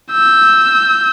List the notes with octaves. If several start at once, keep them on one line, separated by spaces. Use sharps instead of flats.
E6 G6